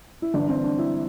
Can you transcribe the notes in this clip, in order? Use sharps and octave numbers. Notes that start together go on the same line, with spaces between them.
E4
G1 G2 E3 D4
C4
D4
E4